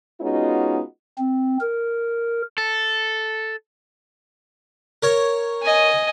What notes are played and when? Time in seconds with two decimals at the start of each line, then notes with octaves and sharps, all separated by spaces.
0.21 G#3 B3 C#4 D#4 F4 F#4
1.18 C4
1.60 A#4
2.58 A4
5.03 A#4 C#5
5.62 D#5 G#5